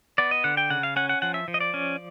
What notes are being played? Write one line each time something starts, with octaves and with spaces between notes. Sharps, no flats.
B3 D5
D#5
D3 F#5
G5
C#3 F#5
F5
C#4 F#5
F#5
F3 F#5
E5
F3
D#5
D5
C#4